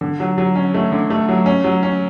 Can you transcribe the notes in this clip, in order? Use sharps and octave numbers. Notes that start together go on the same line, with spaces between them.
D3
F#3
F#3
C#4
A3
D3
A3
F#3
C#4
F#3
C#4